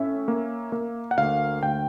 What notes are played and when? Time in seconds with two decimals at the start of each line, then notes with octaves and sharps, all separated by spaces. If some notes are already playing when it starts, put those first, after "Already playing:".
Already playing: A2 C#4 E5
0.28 A#3
0.72 A#3
1.11 F#5
1.17 D2 F5
1.63 D2 G5